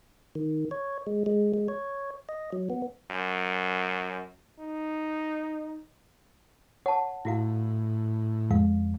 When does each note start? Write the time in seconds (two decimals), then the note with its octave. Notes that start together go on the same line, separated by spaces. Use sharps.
0.35 D#3
0.71 C#5
1.07 G#3
1.26 G#3
1.54 G#3
1.68 C#5
2.29 D#5
2.52 F#3
2.70 B3
3.11 F#2
4.59 D#4
6.86 C#5 F#5 A5
7.25 A2 E4 F#4 F5
8.51 F2 G#3 F5